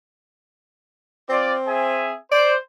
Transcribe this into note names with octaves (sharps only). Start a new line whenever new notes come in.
C4 F4 D5
G#4 E5 G#5
C5 D5